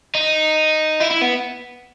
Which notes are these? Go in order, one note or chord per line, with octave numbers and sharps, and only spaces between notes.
D#4
E4
E4
B3